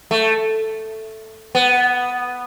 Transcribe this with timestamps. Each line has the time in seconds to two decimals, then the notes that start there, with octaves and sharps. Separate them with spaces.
0.11 A3
1.55 B3